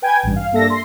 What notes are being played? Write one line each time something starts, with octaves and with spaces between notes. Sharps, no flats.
B4 G5 G#5 G#6
A1 G2
F5
G2 A#3 D4 A4 E5 A#6
C6